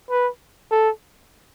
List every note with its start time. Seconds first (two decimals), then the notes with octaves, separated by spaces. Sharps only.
0.10 B4
0.71 A4